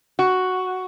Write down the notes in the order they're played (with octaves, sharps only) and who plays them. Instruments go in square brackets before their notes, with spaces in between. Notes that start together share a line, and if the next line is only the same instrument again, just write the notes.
[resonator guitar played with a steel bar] F#4